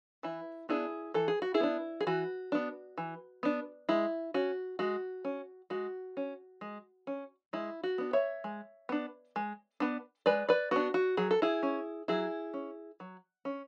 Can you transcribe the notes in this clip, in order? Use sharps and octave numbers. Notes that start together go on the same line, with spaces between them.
E3 E4
B3 D4 E4 G#4
E3 A4
G#4
F#4
E4 G#4
B3 D4
G#4
E3 F#4
B3 D4
E3
B3 D4
G#3 E4
C#4 F#4
G#3 F#4
C#4
G#3 F#4
C#4
G#3
C#4
G#3 E4
F#4
B3 D4
C#5 E5
G#3
B3 D4
G#3
B3 D4
G#3 B4 D5
B4 D5
B3 D4 F#4
F#4
F#3 G#4
A4
E4 G#4
C#4
F#3 E4 G#4
C#4
F#3
C#4